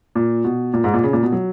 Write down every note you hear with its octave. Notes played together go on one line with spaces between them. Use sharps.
A#2
B2
A#2
G#2
A#2
C#3
A#2
B2
F#3